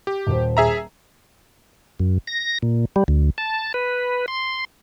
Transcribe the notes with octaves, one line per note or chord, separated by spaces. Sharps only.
G4
D#1 C5
G#4 E5 A#5
F#2
A#6
A#2
G3
D2
A5
B4
C6